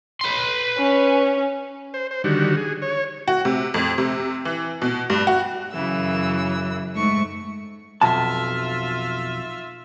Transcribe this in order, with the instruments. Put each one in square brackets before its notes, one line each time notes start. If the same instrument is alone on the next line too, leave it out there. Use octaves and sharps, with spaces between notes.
[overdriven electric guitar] B4 C6
[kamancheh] C#4
[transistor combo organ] C5
C5
D3 D#3 G3 F#4
G#4
C#5
[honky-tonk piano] F#4
C3
F2
C3
E3
B2
G2
F#4
[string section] F#2 [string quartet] C#3 E3 E6
[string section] G#2 [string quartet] A3 C#6
[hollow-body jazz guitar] B1 F2 A5 [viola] F4 E5